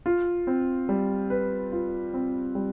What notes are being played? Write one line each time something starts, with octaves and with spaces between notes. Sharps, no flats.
F4
C4
G3
B4
F4
C4
G3